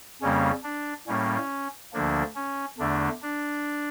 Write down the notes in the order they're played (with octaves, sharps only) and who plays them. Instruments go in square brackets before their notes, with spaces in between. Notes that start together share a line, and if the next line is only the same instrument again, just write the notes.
[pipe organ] F2 C#3 G3 A#3 C#4
D4
A2 G3 A#3 C#4
D2 D3 F3 A#3 D4
C#4
E2 D3 A3 D4
D4